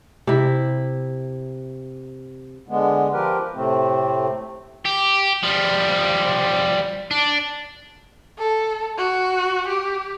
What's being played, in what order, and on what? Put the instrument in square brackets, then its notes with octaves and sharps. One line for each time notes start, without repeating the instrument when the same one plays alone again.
[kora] C3 E4
[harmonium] D3 G#3 B3
F3 G4 A#4 B4
A2 C3 A3 C4
[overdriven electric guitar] G4
F3 G3
D4
[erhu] A4
F#4
G4